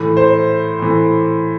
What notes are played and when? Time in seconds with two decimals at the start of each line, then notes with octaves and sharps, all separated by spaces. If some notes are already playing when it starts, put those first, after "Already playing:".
Already playing: A2 E3
0.17 C5
0.79 A2 E3